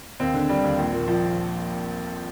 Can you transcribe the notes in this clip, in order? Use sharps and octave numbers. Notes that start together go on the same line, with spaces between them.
D#2 C4
D3
G3
D#2
A#1
A#2
F3